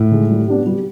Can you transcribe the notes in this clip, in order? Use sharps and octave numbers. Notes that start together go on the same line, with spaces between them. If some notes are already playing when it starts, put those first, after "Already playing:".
Already playing: A2
D#3 G#3
G3
B3 D4 G4
G3